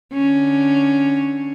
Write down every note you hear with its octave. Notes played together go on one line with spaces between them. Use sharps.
D3 C#4